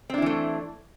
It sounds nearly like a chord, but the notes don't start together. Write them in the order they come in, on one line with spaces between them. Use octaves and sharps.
C4 D4 E4 E3 A3